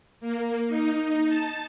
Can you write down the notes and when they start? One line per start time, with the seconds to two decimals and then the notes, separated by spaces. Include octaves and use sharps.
0.21 A#3
0.68 D#4
1.29 A5